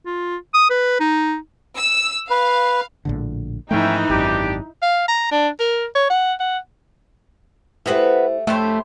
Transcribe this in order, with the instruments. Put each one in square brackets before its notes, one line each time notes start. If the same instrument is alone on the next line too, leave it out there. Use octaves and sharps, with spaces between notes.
[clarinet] F4
D#6
B4
D#4
[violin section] E6
[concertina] B4 [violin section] F5
[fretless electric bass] A#1 A2 D3
[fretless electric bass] G#2 F3 A3 [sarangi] E3 [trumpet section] C#4 E5 G5 [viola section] D#4
[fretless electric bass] G#1 F#2 [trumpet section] D4 G4
[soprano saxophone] F5
A#5
D4
A#4
C#5
F#5
F#5
[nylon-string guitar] A3 G4 A4 [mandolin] B3 F#4 B4 [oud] E4 C5
[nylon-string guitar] F2 C#5 [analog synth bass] A3 [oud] D4 [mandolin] E4 G4 C5